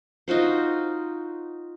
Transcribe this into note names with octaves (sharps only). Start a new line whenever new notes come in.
D#4 F4 F#4 C5